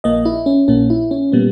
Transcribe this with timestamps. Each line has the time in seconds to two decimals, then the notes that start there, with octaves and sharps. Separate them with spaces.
0.04 A#1 A#2 A#3 D#5
0.25 E4
0.46 C#4
0.68 A#1 A#2 A#3 C#4
0.90 E4
1.11 C#4
1.32 A#2 G3 A#3 B3